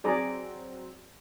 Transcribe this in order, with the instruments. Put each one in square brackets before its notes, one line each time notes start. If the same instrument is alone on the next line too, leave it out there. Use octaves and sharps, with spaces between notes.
[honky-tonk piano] F#3 C4 [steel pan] G#4 D5 A#5